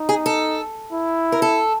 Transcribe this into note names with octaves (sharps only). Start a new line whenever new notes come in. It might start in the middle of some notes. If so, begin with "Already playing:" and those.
Already playing: D#4
G#4
A4
E4
A#4
A4